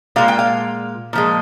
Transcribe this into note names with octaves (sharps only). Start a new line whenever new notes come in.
A#2 G#3 F5
G5
F5
A#2 F3 G#3